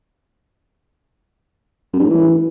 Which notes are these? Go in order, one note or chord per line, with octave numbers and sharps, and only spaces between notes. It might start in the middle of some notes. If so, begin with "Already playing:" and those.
F#2
G2
A2
E3